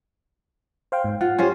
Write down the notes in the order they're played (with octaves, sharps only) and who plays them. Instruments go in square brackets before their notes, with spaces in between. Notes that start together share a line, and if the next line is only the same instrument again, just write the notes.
[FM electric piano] C5 F5 G5
G#2
[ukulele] F4 [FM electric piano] F#5
[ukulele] C#4 F4 C5 [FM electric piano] G4 G#5